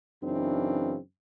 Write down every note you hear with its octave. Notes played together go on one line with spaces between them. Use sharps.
F#2 C#3 E3 C4 D4 D#4